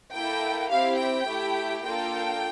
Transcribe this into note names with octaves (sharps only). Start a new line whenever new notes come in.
A#3 E4 A4 G5
C4 E4 G4 F5
G5
A3 E4 G4
A#3 D4 F4 A4 G5